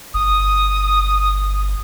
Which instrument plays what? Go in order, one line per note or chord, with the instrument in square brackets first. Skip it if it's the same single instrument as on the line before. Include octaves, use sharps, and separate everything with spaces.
[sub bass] G1 [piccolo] D#6